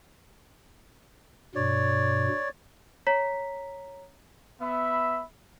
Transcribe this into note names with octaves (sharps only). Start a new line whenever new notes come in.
G2 B2 C#5 D5
C#5 A#5 B6
B3 E5 B5